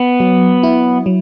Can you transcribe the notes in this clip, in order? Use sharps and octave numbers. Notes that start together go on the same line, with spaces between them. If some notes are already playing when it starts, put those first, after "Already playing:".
Already playing: B3
F#3
E4
F#3